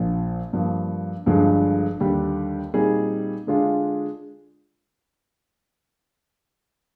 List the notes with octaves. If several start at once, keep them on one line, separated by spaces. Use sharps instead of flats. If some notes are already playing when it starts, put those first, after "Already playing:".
Already playing: A#1 A#2 F3
G2 F3 A#3
G1 G2 D3 F3 G#3
D#2 D3 G3 D4 G4
A#2 G3 C4 D#4 G#4
D3 G#3 D4 F4